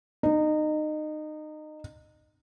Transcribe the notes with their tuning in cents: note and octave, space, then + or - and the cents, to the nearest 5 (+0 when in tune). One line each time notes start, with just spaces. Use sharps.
D#4 -25